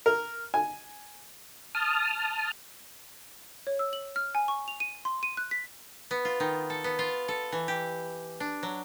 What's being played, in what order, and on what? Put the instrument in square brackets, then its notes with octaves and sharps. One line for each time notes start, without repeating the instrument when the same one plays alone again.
[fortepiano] A#4
G#5
[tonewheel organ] A5 D#6 F6
[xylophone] C#5
E6
F#7
F6
G#5
C#6
F7
D#7
C6
D#7
F#6
B6
[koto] B3
F4
D#3
A4
B3
F4
A4
E3
G4
D4
F#3